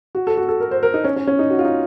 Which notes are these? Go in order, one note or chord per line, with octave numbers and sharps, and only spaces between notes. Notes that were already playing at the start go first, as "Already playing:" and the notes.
F#4
A4
F#4
A4
A#4
C5
A#4
D#4
C#4
C#4
C#4
D#4
F#4
F4
D#4